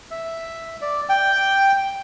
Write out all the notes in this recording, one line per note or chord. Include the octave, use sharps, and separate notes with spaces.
E5
D5
G5